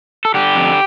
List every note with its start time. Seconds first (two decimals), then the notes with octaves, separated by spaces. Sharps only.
0.25 A4
0.34 D3 G4
0.55 F2